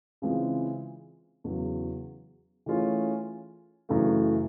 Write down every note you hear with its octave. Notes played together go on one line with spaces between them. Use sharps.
C#3 E3 G#3 C4 F4
E2 C#3 F#3
E3 A3 C#4 F4 G#4
F#2 C#3 E3 A3